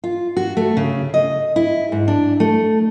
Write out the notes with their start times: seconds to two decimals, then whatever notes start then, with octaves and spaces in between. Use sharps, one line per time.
0.04 F4
0.37 F#4
0.57 A3
0.77 C#3
1.14 D#5
1.56 E4
1.92 G#2
2.08 D4
2.40 A3